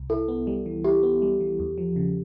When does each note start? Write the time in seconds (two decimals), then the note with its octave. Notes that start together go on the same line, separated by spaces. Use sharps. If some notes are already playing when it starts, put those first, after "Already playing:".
Already playing: C2
0.10 E4 A4
0.28 B3
0.47 G3
0.66 E3
0.84 E4 G4
1.03 B3
1.22 G3
1.40 E3
1.60 E2
1.78 F3
1.96 C#3